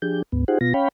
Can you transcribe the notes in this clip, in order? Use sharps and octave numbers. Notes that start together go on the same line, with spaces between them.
F3 D4 G4 G#4 G6
D2 G#2 B3
D#4 F4 G4 G#4 C5 F#5
B2 B3 F4 A#6
C#4 C#5 F5 G5 B5